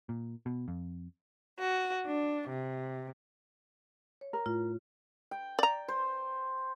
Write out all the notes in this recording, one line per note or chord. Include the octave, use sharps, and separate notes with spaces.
A#2
B2
F2
F#4
D4
C3
C#5
A#4
A2 F4
G5
D5 A#5
C5